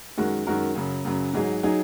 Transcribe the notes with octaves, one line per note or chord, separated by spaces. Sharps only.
F#2 D#3 G#3 F#4 A#4
F#2 D#3 G#3 F#4 A#4
F#2 C#3 F#3
F#2 C#3 F#3
G#2 F#3 D#4 G#4
F#3 D#4 G#4